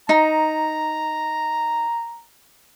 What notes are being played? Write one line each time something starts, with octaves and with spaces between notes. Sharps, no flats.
D#4 A#5